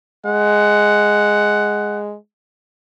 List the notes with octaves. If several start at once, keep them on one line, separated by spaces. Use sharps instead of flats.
G#3 F#5